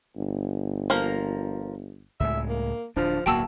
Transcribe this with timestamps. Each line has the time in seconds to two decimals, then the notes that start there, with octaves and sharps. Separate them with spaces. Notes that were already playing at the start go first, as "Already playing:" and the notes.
0.16 G1
0.90 F3 A#3 A#4
2.20 C#2 A2 G#3 E5
2.49 A#3
2.96 D1 F3 D4
3.26 D1 B1 A#3 F#4 G5 A5 E6